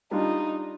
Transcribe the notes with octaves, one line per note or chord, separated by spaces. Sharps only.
G3 D4 D#4 F4